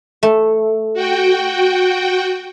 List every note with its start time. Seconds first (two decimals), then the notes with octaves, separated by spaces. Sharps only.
0.23 A3
0.94 F#4 G5